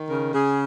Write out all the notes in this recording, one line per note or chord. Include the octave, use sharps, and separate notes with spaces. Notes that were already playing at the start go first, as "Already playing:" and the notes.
Already playing: D#3
C#3 A#4
C#3 G#4